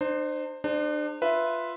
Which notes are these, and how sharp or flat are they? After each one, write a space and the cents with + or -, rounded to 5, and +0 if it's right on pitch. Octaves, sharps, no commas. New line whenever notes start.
D4 +45 C5 +0
D4 +35 G#4 -20 C5 +0
F4 +0 B4 +0 E5 +5